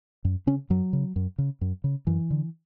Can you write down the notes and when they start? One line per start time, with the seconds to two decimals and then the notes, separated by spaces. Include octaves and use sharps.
0.25 F#2
0.47 C#3 C#4
0.70 F#2 F#3
0.93 C#3
1.16 F#2
1.38 C#3
1.61 F#2
1.84 C#3
2.07 F#2 E3
2.31 D3